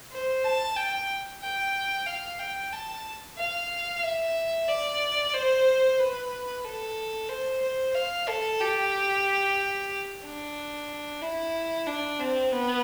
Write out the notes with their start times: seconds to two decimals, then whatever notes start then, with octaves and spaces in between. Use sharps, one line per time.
0.12 C5
0.45 A5
0.76 G5
1.42 G5
2.07 F5
2.40 G5
2.73 A5
3.38 F5
4.03 E5
4.68 D5
5.33 C5
5.99 B4
6.65 A4
7.29 C5
7.62 C5
7.94 F5
8.28 A4
8.61 G4
10.24 D4
11.22 E4
11.87 D4
12.19 C4
12.52 B3